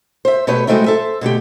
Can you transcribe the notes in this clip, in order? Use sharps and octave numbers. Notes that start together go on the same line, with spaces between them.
C5 E5
B2 A3 G4 B4 C#5
F#3 G#3 A3 C4 D#4 E4
A4 C5 E5
B2 D3 A3 G4